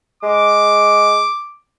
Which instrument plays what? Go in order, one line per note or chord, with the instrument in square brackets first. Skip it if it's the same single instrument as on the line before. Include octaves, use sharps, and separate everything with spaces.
[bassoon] G#3 [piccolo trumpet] D6